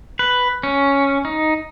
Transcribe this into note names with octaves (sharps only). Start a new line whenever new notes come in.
B4
C#4
D#4